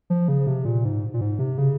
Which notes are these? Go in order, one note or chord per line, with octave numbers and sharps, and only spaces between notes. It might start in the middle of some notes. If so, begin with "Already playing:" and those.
F3
C#3
C3
A#2
G#2
A#2
G#2
C3
C#3